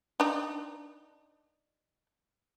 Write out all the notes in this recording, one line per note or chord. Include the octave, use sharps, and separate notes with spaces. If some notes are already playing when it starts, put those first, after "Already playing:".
D4 D#4